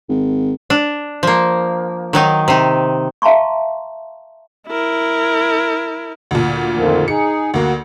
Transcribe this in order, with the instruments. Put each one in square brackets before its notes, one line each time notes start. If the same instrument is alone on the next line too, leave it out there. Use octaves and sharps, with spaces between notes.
[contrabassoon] G#1
[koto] D4
F3 A#3
D#3 F#3 D#4
C3 D#4
[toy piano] E5 F5 A5 A#5 C6 C#6
[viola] E4 A#4
[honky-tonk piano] D2 A#2
[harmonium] F2 D#3 F3
[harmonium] D#4 G#4 [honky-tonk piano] C#7
[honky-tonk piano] D2 A#3 [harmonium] F#4